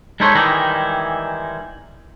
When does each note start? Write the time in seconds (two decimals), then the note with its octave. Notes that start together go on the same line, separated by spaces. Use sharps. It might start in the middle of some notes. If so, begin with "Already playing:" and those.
0.20 G#3 D#4 E4 A4 C5 C#5
0.35 D#3 E3 G3 G#3 D#4 E4